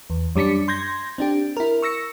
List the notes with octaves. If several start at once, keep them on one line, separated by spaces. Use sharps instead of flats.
E2
F#2 G3 D4 B6 C#7
C6 G6 G#6 A#6
C4 D4 G4
E4 A#4
C#6 E6 A#6 C#7